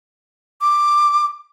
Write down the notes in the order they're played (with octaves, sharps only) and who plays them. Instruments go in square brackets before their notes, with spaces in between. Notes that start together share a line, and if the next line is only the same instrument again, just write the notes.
[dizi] D6